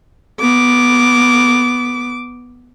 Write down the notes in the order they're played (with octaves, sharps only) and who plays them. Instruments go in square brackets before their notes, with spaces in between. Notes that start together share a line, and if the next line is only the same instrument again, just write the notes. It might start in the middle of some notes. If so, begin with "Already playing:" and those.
[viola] B3 D6